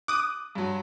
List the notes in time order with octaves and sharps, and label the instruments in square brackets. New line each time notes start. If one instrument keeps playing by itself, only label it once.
[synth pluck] D6 D#6 [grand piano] F#6
[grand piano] G2 F#3